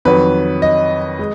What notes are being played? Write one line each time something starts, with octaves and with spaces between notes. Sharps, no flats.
F2 D#3 F#3 B4
D#5
G#3